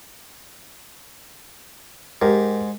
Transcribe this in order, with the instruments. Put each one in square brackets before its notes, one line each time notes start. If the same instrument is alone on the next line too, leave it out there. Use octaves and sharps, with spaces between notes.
[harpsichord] G#2 [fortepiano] G4 A#4